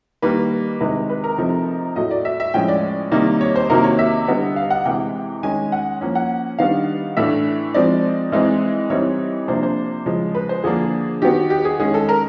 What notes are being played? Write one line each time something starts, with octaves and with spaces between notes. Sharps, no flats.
D#3 G3 A#3 B4
C3 D#3 G#3 B4
B4
A#4
C3 F3 A3 C4 D#4
A2 F#3 A3 D#5
D5
E5
E5
A2 F3 G#3 C#4 G5
D5
C3 D#3 G3 A#3 D#4
C#5
C5
C3 D#3 F#3 A#3 A#4
C#5
E5
D3 G3 B3 D#4
F5
F#5
C3 E3 G#3 G5
D#3 G#3 C#4 G#5
F#5
F3 A#3 C#4
F#5
D#3 G3 B3 D4 F5
A2 E3 A3 D4 E5
F3 G#3 C4 D#4 D5
E3 G#3 C4 D#4
E3 G3 C4 D#4 C#5
C3 F3 A#3 D4 C5
C5
C#3 F3 G#3
B4
C5
D3 F3 A#3 D4 G#4
D#3 F#3 B3 G4
G4
G#4
D#3 G#3 C#4 G#4
A4
A#4